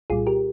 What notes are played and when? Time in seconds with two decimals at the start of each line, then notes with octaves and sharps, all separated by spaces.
0.10 C2 A#2 G3 F4 G#4
0.27 G4 A#4